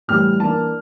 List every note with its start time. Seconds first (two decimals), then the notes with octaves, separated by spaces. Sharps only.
0.08 A2 E3 G3 F6
0.40 E3 A#3 D4 A5